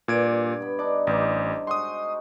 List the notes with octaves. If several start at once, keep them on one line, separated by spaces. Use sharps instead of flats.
G2 A#2 G#6 D7
B3 B5
D4 D#4 D5 D6
A1 D#4 C5 D5
G#3 F#4 C6 D#6